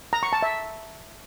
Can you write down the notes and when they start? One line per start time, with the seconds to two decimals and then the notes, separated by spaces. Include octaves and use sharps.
0.13 A#5
0.23 C#6
0.33 A5
0.43 E5